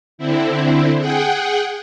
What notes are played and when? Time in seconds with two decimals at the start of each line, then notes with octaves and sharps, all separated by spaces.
0.18 D3 C4 E4
0.98 G#4 F#5 G5